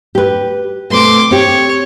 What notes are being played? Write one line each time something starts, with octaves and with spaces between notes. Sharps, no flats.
G4 B4
B2 A3 C4 C6 D6
C4 G4 C#5